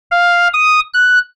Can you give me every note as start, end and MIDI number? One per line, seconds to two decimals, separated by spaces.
0.11 0.48 77
0.53 0.80 87
0.94 1.18 90